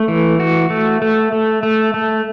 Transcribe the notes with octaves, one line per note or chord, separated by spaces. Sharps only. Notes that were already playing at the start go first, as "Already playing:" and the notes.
Already playing: A3
E3
F#4
A3
A3
A3
A3
A3